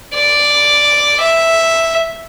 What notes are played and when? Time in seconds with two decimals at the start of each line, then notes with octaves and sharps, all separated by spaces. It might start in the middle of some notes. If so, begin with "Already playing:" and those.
0.14 D5
1.20 E5